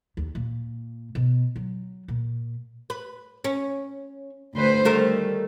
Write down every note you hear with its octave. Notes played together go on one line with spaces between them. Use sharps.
D#2
A#2
B2
F#3
A#2
B4
C#4
D2 B4 C5
D#3 G3 A3 A#4